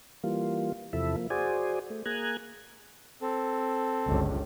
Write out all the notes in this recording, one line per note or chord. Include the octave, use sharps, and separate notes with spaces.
E3 G3 A#3 F4
E2 C3 F3 E4 A4 E5
F3 A#3
F#4 G#4 C5 D5 G#5
A3
A#3 G#4 G#5 A#5 F#6 G#6
C4 A4
G1 C#2